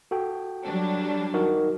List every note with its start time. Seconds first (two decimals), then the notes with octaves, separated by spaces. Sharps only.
0.11 F#4 A4 G5
0.64 F#3 G3 D4
1.34 D#4 F#4 A#4